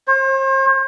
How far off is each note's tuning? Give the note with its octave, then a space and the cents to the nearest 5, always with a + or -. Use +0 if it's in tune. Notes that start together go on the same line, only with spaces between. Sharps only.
C5 +40